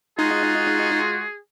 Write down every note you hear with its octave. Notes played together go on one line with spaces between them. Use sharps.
G#3 D#4 F4 F#4 G#4